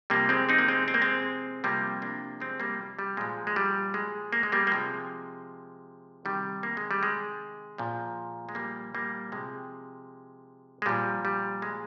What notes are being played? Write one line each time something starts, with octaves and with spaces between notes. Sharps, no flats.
C3 F3 G3 A#3
G#3 C4
C4 D#4
A#3
G#3 C4
C4
A#3
G#3 C4
C3 F3 G3 A#3
A#3 D4
G#3 C4
G3 A#3
G3
A#2 F3 G#3
G#3
G3
G#3
A#3
G#3
G3 A#3
A#3
C3 F3 G#3
C3 D#3 G3
A#3
G#3
G3
G#3
A#2 F3
G#3
G3 A#3
G3 A#3
C3 F3 G#3
G#3
A#2 F3 G3
G3
G#3